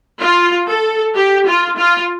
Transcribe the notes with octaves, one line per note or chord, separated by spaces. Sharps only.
F4
A4
G4
F4
F4